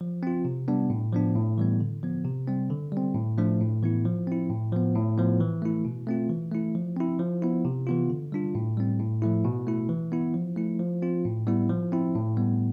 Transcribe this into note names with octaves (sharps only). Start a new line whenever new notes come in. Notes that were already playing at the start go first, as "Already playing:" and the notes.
F3
C4 F4
C3
G3 B3 D4
A2
F3 B3 D4
A2
E3 G3 B3
D3
F3 B3
C3
G3 C4
D3
G3 C4
A2
F3 A3 D4
A2
E3 B3 E4
F3
C4 E4
A2
F3 B3
A2
F3 B3
E3
A3 E4
B2
A3 C4 F4
E3
A3 E4
F3
C4 E4
F3
B3 E4
C3
E3 B3 F4
D3
G3 D4 F4
A2
G3 C4
A2
F3 A3 E4
B2
A3 E4
E3
B3 E4
F3
A3 E4
F3
C4 F4
A2
G3 B3 E4
F3
C4 E4
A2
G3 B3